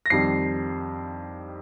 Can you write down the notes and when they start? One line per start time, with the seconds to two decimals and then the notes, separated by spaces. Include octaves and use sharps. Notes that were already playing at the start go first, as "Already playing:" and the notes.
0.06 A#6
0.10 F2 D#3 G3 C7